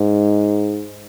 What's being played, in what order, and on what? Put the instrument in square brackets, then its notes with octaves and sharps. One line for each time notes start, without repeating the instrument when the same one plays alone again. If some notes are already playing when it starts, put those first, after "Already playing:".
Already playing: [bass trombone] G#2